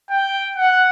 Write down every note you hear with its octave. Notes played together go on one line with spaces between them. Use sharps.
G5
F#5